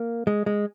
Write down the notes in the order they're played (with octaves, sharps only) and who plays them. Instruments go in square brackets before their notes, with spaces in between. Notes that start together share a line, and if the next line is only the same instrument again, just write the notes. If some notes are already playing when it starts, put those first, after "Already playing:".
Already playing: [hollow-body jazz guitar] A#3
G#3
G#3